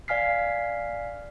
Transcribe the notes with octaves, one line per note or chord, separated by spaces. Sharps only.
D5 F5 G#5 F6 B6 C7